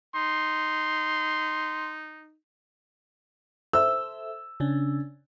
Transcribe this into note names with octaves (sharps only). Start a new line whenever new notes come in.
D#4 C6
A4 C5 E5 E6
C#3 C#4 D4